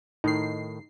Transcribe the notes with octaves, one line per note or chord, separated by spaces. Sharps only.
A2 D#3 D#4 C7